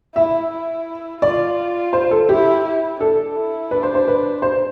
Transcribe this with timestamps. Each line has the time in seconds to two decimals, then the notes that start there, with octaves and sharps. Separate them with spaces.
0.15 E4 E5
0.51 E4
1.22 F4 D5
1.93 C5
2.11 A4
2.29 E4 G4
2.65 E4
3.01 D4 A4
3.36 E4
3.71 D4 B4
3.83 C5
3.95 C5
4.08 B4
4.42 C5